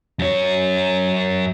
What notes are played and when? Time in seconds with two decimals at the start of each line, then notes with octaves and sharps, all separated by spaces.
0.19 F#2 C#5